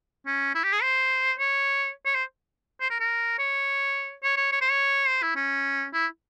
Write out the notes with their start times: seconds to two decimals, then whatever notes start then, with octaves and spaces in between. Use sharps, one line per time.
0.26 C#4
0.55 E4
0.64 G4
0.72 G#4
0.82 C5
1.39 C#5
2.06 C#5
2.15 C5
2.81 C5
2.90 A#4
3.00 A#4
3.38 C#5
4.23 C#5
4.37 C#5
4.52 C#5
4.61 C5
4.71 C#5
5.08 C5
5.22 E4
5.36 C#4
5.93 E4